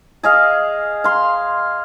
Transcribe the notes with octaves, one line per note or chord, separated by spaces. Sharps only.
G#4 D#5 F5
F5 C6